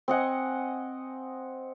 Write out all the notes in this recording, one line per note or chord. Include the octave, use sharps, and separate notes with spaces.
C4 D#5 F#5 G#5